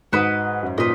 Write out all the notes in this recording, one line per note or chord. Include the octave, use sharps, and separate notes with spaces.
G#2 F#4 B4 D#5
F#2
A#2 B4 D#5